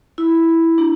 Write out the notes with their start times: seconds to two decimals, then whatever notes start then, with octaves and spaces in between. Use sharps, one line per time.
0.18 E4
0.78 D4